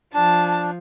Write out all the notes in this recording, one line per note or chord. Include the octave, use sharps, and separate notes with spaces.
F3 D4 A5